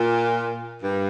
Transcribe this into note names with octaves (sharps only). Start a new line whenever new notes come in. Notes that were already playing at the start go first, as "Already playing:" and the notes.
Already playing: A#2
G2